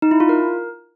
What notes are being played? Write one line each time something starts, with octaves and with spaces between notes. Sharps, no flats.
D#4
E4
F4
A#4